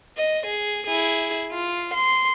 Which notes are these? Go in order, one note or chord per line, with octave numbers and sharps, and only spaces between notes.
D#5
G#4
E4 G#4
F4
C6